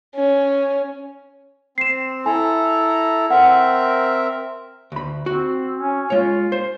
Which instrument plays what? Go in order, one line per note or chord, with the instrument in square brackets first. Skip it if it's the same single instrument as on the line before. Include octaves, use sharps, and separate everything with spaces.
[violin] C#4
[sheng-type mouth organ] C4 [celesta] C7 E7
[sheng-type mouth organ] E4 A4 A#5 [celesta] G#5
[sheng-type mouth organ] C4 A#4 E5 [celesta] F#5
[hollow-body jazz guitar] D2 B5
[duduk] C4 [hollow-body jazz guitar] F#4
[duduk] C#4
[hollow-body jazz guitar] G#3 C#5 [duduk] F4
[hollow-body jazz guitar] C5